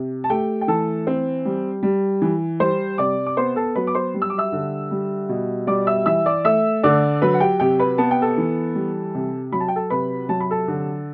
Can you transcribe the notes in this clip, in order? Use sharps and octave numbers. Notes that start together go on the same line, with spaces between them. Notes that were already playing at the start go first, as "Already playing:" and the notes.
Already playing: C3
A5
A3 G4 G5
G5
E3 A4 A5
C4
G3
G3
E3
G3 C5 C6
C3 D5 D6
D6
B3 C5 C6
A4 A5
F#3 B4 B5
D6
C5 C6
G3
E6
D6
E5 E6
D3
G3
B2
G3 D5 D6
E5 E6
E3 E5 E6
D5 D6
A3 E5 E6
D3 D5 D6
F#3 B4 B5
F#5
G4 G5
C3 G4 G5
B4 B5
B3 A5
G5
A4 A5
E3
G3
C3
F#3 B5
A5
G5
A4 A5
C3 B4 B5
F#3 A5
B5
A4 A5
D3